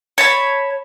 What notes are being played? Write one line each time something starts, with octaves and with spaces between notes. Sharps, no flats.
C#5 A5 B5